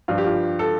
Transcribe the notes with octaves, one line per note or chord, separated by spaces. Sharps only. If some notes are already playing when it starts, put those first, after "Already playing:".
G2 F3 F4
G4
F4
A4